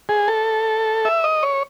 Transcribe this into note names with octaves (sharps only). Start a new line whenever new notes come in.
G#4
A4
E5
D#5
C#5